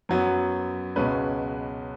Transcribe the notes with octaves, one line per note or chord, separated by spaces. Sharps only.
F#2 F#3 B3
C#2 B2 G#3 C#4 B4